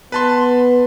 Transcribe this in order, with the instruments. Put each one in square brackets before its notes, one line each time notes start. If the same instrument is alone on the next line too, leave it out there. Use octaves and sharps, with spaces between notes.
[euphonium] B3 [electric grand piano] B4 A5 C6